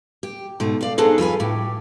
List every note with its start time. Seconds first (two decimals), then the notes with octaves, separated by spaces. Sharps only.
0.23 G4
0.60 G#2 B2 A3
0.81 D5 F5
0.98 B3 C4 D4 D#4 G#4 A4
1.18 F2 F4 B4 G#5
1.40 A2 G4